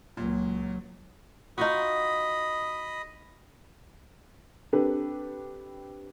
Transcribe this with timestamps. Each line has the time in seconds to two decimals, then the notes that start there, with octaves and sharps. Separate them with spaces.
0.17 C#2 A#2 F#3
1.58 D#4 F4 F#4 D#5 B5 D#6
4.73 C4 D4 G4 A4 B4